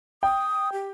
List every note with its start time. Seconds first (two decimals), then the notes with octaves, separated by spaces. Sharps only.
0.23 G5 D#6
0.73 G4